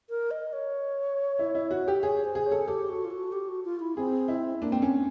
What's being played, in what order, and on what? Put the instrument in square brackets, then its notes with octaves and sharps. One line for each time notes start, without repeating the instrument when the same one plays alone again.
[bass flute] A#4
D#5
C#5
[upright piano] E4
E4
F#4
G4
[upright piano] G#4 [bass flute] C#5
[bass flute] C5
[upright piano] G#4
[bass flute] C#5
[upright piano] A4
[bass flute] G4 [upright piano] A4
[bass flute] F#4
F4
F#4
G4
F#4
F4
E4
[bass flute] C4 [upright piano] G#4
[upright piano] E4
[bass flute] A#3 [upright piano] D4
[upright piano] C4
C#4